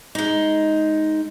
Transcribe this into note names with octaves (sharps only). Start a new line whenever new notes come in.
G#3 D#4